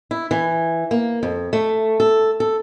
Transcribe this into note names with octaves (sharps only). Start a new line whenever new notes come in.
E4
E3
A#3
F2
A3
A4
A4